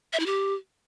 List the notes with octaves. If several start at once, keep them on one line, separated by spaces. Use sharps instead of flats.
E5
E4
G4